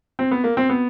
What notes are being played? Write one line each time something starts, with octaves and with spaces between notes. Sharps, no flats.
C4
B3
A#3
C4
B3